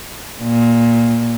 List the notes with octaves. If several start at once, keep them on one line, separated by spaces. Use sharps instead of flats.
A#2